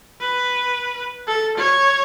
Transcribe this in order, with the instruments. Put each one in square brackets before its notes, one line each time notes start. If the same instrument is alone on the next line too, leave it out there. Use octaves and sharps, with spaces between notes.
[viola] B4
A4
C#5